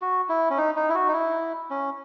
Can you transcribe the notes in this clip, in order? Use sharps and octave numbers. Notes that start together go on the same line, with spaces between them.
F#4
E4
C#4
D#4
D#4
E4
F#4
D#4
E4
C#4